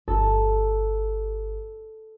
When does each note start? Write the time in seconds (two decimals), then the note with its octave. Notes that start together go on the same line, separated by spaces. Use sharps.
0.08 G1 A4